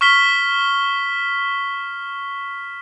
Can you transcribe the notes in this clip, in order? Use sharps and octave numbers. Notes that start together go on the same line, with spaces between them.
C#6 F6 B6 G7